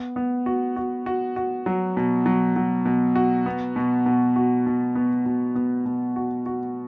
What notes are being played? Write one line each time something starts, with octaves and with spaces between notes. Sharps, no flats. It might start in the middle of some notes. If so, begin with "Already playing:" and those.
Already playing: B3
B3
F#4
F#4
F#4
F#4
F#3
B2
F#3
F#3
B2
F#4
B3
B2
B2
F#4
B2
B3
B2
B3
B2
F#4
F#4